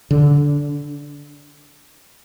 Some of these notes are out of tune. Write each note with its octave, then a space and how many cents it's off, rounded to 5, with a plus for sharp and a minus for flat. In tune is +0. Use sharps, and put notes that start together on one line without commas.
D3 -15